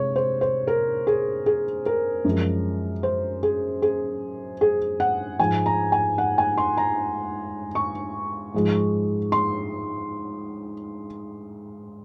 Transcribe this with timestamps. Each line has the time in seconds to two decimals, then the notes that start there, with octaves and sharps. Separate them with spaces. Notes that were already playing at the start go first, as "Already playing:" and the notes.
Already playing: C3 G#3 C#5
0.16 C5
0.41 C5
0.68 A#4
1.07 G#4
1.46 G#4
1.86 A#4
2.25 F#2 F3 G#3
3.03 C5
3.43 G#4
3.82 G#4
4.61 G#4
5.00 F#5
5.40 G#2 F3 G#3 G#5
5.66 A#5
5.92 G#5
6.18 F#5
6.38 G#5
6.58 C6
6.77 A#5
7.75 C#6
8.54 G#2 F3 G#3
9.32 C6